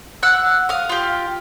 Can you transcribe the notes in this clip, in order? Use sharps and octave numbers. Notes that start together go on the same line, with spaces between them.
F#5 E6 F#6
F5 D#6
F4 G4